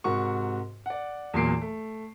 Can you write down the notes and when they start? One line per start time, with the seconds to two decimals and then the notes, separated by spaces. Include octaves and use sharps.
0.04 G#2 C3 F#4 A#4 C#6
0.86 D5 F#5
1.34 E2 A#2 F#3 A#3 C7 D7
1.62 A3